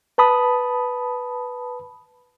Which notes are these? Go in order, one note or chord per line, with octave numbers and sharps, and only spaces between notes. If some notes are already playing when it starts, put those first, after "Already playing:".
B4 A5 B5 D#6